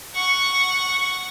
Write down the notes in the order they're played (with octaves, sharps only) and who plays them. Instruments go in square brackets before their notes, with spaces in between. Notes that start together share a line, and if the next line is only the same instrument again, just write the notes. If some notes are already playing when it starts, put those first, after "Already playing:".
[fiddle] F#5 C#6